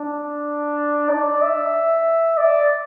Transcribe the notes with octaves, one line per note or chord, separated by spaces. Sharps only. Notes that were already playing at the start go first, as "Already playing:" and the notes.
Already playing: D4
D5
E5
D5